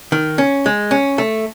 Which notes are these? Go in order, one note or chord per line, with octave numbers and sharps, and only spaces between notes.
D#3
C#4
G#3
C#4
A3